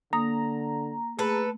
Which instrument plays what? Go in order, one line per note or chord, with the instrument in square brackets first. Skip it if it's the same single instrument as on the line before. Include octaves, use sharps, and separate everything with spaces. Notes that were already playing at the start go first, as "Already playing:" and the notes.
[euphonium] D3 [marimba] A#3 D#6 [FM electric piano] A#5
[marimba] A3 [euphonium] G#4 [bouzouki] A4 B4